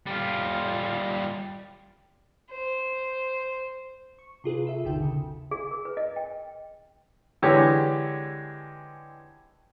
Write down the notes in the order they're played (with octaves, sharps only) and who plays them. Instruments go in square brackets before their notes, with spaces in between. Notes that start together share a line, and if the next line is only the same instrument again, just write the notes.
[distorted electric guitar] G3 F4
[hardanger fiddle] C5
[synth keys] C#6
C3 F4 G#4 B4
A4 E5
G#1 D#2 B2 D3 G5 E7
C#3
[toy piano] G#4
A#4
B4
D#5
G5
[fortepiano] D3 E3 G#3 G4 C#5